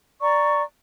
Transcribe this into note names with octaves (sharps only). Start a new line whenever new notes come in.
D5 A#5 C#6